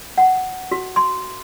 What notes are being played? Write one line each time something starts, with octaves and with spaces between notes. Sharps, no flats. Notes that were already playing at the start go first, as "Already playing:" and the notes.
F#5
F#4
C6